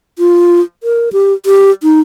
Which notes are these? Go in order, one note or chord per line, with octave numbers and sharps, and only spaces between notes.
F4
A#4
G4
G4
D#4